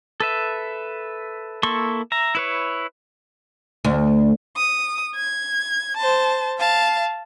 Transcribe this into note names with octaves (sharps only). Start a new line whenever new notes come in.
A4 B4 E5
A#3 E4 A4 C6 C#6
E5 A#5
E4 B4 C#5
D2
D#6
G#6
C5 A5
F5 A5